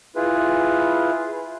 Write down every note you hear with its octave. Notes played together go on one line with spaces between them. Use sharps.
E4 F4 G#4 B4